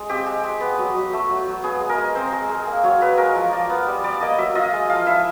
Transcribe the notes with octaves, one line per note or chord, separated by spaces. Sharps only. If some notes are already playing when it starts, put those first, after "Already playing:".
Already playing: G#3
C4 G4
G#3
G#3
B3
F#3
F#3
A3
F#3
F#3
B3 G#4
G#3
A#4
G#3
C4 C5
G#3
G#3
A#3
F#3 C#5
F#3 B4
G#3 A#4
F3
F3 D5
B3
G3
G3 D5
A#3 D#5
F#3 E5
F4 D#5
G#3
F3 F5
E4 E5